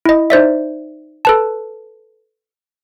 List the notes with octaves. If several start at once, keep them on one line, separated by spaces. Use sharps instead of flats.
E4 D#5
D#4 C5 D5 E5
A4 B4 A5